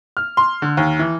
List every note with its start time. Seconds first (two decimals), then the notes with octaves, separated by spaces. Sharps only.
0.17 F6
0.37 C6
0.62 D3
0.77 D#2
0.99 E3